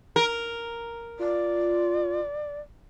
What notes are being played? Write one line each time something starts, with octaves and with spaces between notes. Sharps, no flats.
A#4
F4 D5